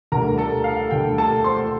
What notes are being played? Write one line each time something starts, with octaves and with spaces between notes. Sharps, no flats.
D2 D3 G3 A#4 A#5
A4 A5
F5
D2 D3 G3 G5
A4 A5
C5 C6